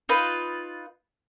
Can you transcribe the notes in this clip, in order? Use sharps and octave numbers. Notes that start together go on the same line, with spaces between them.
D#4 F4 B4